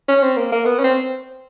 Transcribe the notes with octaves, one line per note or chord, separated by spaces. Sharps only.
C#4
C4
A#3
A#3
B3
C#4
C4